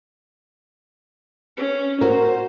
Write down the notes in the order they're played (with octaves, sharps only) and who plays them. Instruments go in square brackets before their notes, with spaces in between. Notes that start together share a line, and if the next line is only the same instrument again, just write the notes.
[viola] C#4
[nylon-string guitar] F#4 A#4 [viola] C5